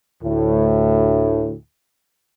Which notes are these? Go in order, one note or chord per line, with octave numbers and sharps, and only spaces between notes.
D2 A2